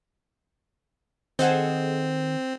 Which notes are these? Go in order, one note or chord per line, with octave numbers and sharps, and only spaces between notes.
D#3 C4 G#4 A4 C5 D#5 F#5 G#5